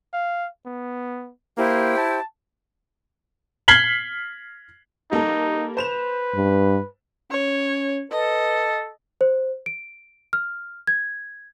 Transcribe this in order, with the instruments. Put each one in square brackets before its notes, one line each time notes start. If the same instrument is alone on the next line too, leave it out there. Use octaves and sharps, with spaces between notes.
[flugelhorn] F5
B3
[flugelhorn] A#3 [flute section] E4 G4 C5
[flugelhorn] A5
[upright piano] F6 G#6 B6 C7 F#7 G7
[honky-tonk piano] G3 A#3 A4 [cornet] D#4
[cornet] B4 [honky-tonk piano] C5 E7 F7
[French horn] G2
[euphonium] C#4 [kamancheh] C#5
[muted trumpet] A4 [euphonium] B4 [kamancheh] D#5
[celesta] C5
D7
F6
G#6